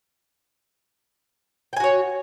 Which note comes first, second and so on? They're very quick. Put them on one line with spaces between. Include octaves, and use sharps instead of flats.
G5 G#5 F#4 C#5